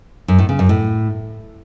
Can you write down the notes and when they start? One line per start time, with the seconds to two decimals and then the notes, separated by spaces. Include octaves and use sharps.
0.28 F#2
0.39 A2
0.49 C#3
0.59 F#2
0.69 A2